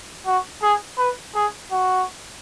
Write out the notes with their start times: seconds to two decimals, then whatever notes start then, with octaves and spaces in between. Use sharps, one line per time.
0.27 F#4
0.62 G#4
0.98 B4
1.35 G#4
1.71 F#4